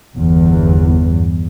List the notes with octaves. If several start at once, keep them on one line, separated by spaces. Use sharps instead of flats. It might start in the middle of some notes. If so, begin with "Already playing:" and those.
G1 E2